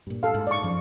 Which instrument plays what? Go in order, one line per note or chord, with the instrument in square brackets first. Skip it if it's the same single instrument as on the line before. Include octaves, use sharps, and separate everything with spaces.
[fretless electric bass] G2 A#2
[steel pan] A4 F5
[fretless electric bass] G#2
[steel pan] D5 C#6
[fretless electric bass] F#2 F3